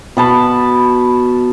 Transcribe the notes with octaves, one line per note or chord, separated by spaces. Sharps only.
B2 A5 B5